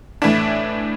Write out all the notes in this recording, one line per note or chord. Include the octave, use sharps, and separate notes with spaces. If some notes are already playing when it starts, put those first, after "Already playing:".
A2 E3 A3 D4